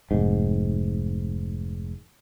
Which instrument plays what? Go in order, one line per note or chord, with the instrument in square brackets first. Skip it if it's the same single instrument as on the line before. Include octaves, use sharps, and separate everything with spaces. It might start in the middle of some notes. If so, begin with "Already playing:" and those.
[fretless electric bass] F1 G#2